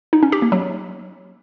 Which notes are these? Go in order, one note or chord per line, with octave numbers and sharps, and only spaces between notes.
D#4
C#4
G4
A#3
F#3